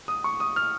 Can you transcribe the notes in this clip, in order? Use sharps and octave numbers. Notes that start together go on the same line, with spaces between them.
D#6
C#6
D#6
F6